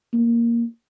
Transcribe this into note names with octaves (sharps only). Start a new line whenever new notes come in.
A#3